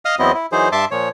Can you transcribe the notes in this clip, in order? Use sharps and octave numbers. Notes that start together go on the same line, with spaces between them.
D#5 F5 D#6 F6
E2 F#3 B3 C4 E4 D#5
E4
E3 F#3 D#4 G#4 C5
G2 E5 A5 C6 D6
A#2 F3 C#5